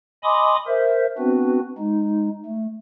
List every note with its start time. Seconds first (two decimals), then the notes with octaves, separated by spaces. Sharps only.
0.24 D#5 G#5 B5 C6 D6 D#6
0.67 A#4 C5 E5
1.18 B3 C4 D4 F#4 B4
1.78 G#3 D#4
2.45 A3